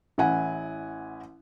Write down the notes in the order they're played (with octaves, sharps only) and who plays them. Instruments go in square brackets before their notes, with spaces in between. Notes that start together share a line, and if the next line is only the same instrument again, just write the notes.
[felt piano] A1 E4 F#5 G#5